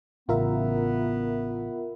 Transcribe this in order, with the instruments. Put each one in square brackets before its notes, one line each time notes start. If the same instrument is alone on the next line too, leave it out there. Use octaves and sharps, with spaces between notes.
[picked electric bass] A1 C#3 [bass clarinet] B3 [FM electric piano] F4 A#4 E5